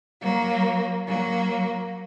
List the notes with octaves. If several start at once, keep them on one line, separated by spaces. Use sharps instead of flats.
F#3 A#3
F#3 A#3